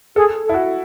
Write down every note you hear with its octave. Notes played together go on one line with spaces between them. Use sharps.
G#4 A4
A4
E4
F#4